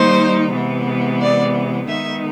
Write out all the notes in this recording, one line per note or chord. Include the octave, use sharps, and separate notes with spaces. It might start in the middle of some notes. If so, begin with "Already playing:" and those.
Already playing: D#3 G3 A#3 D#4 C5
C3 E3 G#3 B3
D5
D#3 G#3 B3 D#4 E5